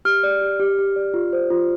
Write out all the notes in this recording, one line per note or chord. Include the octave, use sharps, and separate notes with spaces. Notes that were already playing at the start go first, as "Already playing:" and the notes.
G4 F6
D5
G4
G4
G4
D5
F4
C5
F4